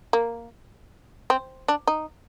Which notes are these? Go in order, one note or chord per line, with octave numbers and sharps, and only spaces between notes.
A#3
C4
D4
D#4